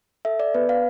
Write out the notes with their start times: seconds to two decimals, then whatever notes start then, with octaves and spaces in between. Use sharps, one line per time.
0.25 A4 E5
0.40 D5
0.54 B3 B4
0.69 F5